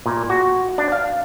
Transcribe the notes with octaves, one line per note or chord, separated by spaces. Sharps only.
A#2
F#4
D4
F5